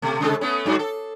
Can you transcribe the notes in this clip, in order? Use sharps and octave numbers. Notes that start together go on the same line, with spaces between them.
B2 A3
C3 G#3 A4
A3 B3 C#4
G2 F#3 F#4
A4